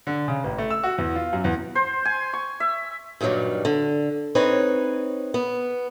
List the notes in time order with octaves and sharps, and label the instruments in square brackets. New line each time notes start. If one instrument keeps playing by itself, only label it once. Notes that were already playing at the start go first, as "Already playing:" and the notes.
[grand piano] D3
C#3
A1
A3
E6
F#4
E2
F4
F#2
E2
[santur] C5
G#5
C#6
E5
[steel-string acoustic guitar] G2 A#2 D#3 F#3 G3
D3
C4 D#4 B4 C#5
B3